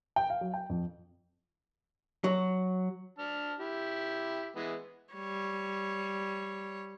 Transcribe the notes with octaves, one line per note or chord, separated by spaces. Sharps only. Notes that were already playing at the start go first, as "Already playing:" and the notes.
G5
F5
F#3
G5
F2
F#3
D4 A5 F6
E4 G4
E3 G#3 B3
G3 C#5